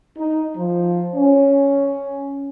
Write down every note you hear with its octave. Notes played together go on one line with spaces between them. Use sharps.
D#4
F3
C#4